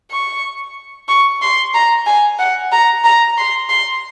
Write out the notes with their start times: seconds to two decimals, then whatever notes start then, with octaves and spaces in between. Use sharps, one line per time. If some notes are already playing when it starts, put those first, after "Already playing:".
0.11 C#6
1.08 C#6
1.42 C6
1.74 A#5
2.06 G#5
2.39 F#5
2.72 A#5
3.04 A#5
3.38 C6
3.69 C6